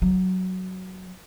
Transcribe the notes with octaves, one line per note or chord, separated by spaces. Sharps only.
F#3